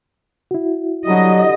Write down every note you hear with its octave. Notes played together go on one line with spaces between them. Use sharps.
E4 F#4
D3 F#3 G3 D#5